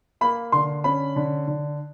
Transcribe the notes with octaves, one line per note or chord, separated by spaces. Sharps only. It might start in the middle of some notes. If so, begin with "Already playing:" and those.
A#3 B5
D3 C6
C#4 B5
D3
D3